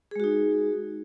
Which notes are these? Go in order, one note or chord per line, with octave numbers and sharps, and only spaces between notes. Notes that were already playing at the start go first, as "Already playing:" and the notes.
G#3 D#4 F#4 G#4